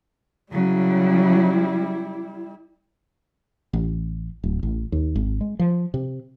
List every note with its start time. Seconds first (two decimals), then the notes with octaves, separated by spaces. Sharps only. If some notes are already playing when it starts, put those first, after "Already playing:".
0.52 C#3 F#3 G3 E4
3.73 A1
4.43 D1
4.63 A1
4.92 D#2
5.16 G#1
5.41 G#3
5.59 F3
5.94 C3